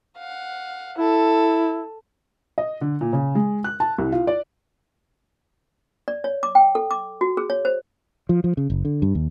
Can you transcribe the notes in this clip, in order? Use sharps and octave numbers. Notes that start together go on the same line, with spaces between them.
F5 F#5
E4 A4
D#5
D3
A#2
C#3
G#3
F#6
A5
C2
F4
D5
D5
C#5
D6
G5
A4
D6
F#4
G#4
C#5
C5
F3
F3
C#3
F#1
D3
G2
D#2